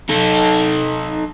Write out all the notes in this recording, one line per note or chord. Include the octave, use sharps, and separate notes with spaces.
D#4 A4